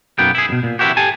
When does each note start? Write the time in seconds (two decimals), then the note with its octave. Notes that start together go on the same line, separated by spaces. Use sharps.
0.18 B1 F#2 A#3 B3 G5
0.35 E4 G#4
0.49 F#2 B2
0.63 A#2
0.79 C3 E3 F#3 E4 F#4 G4
0.97 G4 A4 G#5 A5